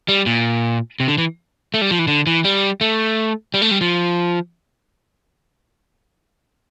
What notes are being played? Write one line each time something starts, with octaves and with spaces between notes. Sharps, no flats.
G3
A#2
C3
D3
E3
A3
G3
F3
E3
D3
E3
G3
A3
G3
A3
G3
F3